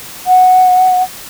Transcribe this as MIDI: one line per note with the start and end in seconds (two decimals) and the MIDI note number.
0.27 1.03 78